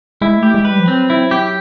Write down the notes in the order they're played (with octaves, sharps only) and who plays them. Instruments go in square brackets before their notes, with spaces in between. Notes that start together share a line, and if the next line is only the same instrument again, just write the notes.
[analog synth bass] G#3 [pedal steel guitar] E4
[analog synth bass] A3
[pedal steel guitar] G4
[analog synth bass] G#3
[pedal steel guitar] B4
[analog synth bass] G3
F3
[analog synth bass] F#3 [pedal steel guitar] C4
[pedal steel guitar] E4
G4